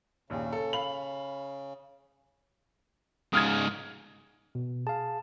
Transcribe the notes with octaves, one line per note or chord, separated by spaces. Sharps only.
A#1 D#2 C#3
A4
F5 B5 F#7
G#2 C#3 D#6 F6 G#6
B2
G#4 F5 A5